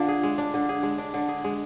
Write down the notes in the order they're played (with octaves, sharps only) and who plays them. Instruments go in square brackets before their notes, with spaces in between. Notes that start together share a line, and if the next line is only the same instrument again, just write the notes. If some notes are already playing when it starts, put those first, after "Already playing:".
Already playing: [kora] D3 D4 [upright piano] F4
[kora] G#4
G#3
D4
D3
G#4
G#3
D4
D3
G#4
G#3